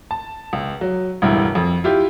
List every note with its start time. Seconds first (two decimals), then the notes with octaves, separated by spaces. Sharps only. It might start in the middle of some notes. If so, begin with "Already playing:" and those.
0.11 A5
0.53 C#2
0.81 F#3
1.22 E1 C#2 G2 E4
1.55 F2
1.84 E4 F4 G4